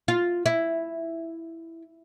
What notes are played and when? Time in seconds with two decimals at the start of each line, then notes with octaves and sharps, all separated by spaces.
0.08 F4
0.46 E4